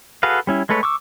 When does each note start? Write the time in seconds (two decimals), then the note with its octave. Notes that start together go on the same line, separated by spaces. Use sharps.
0.23 F#4 G#4 A4 B4 F5
0.47 G3 C#4 E4
0.69 G#3 A3 A4 B4 C#5
0.83 C#6 D6 E6